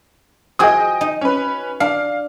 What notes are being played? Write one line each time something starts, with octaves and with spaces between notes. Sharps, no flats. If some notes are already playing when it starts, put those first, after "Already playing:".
F3 F#4 G#4 D#5 G5 D#6
D#4
C#4 B4
D4 F5